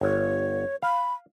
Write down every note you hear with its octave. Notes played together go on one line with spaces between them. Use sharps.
G1 C#5
F5 B5